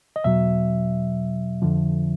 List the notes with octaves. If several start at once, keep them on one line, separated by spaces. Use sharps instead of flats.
D#5
E2 B2 F#3 E5
F2 D3 F3